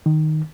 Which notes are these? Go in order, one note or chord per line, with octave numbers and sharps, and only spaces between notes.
D#3